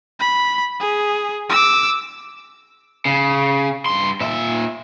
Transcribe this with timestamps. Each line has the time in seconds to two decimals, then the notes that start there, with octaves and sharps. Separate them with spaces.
0.20 B5
0.80 G#4
1.50 D6 E6
3.05 C#3
3.86 G2 C6
4.21 A#2 E5